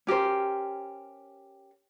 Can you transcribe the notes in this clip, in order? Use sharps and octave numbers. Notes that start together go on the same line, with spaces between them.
C#4 G4 A#4 C5